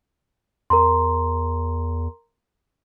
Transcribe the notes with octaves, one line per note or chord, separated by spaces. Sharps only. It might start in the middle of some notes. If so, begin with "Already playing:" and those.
E2 A#4 A#5 C6